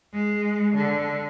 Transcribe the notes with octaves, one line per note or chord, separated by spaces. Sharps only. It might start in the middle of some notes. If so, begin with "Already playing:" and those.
G#3
D3